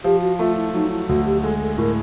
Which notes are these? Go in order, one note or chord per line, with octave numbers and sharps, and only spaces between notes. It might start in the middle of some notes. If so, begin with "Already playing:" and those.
F3 G4
F#4
A3 F4
E4
F#3 D#4
E4
D2 F#4
G4
G#3 A4
A4
A2 A#4